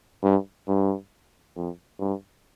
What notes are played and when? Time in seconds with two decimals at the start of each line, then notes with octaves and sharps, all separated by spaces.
0.23 G2
0.68 G2
1.56 F2
2.00 G2